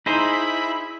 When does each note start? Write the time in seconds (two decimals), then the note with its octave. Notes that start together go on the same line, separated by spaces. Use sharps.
0.06 D#4 E4 G#4 C5 B5